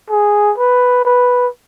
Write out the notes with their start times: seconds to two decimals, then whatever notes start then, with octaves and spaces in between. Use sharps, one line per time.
0.10 G#4
0.58 B4
1.05 B4